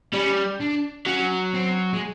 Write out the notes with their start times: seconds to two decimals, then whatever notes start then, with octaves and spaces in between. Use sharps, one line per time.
0.13 G3 C#4
0.60 D4
1.07 F#3 C#4
1.54 C4
1.93 G#3